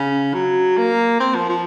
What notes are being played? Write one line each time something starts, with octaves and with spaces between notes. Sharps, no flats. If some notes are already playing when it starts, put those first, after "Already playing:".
Already playing: C#3
F#3
A#3
C4
F3
F3